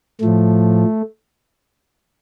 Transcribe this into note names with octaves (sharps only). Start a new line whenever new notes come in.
A2 F3 A3